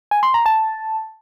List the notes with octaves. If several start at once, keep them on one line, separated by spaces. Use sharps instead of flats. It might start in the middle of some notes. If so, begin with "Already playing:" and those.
G#5
C6
A#5
A5